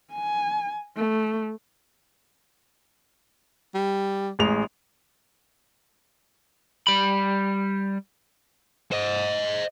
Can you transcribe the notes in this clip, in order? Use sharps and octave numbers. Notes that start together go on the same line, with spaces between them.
G#5
A3
G3
A1 G#3 F7
G3 B5
C5 D#5